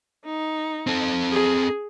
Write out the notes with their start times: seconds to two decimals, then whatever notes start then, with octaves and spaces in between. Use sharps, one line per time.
0.25 D#4
0.87 C4 A4
1.31 G#4